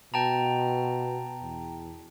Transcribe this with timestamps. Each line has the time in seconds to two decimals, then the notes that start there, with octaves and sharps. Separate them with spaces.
0.14 B2 G5 A5 A#5
1.42 E2